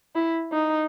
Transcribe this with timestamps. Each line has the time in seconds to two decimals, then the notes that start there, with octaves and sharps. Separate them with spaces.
0.15 E4
0.52 D#4